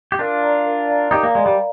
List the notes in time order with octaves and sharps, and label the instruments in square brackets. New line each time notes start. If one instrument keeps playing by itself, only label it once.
[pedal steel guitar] G4
[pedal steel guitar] D4 F4 [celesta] A#4
[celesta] D5 F5 A#5
A#4
D5 F5 A#5
[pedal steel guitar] D#4 G4 [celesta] A#4
[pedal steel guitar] A#3
[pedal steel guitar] G#3 [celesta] D5 F5 A#5
[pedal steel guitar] G3